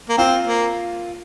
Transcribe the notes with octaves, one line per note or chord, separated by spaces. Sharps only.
A#3
C4 F4
A#3